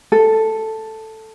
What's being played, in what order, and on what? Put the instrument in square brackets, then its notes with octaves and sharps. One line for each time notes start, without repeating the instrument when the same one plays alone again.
[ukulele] A4